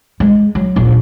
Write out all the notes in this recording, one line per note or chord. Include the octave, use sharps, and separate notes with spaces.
G#3
F#3
D#1 A#1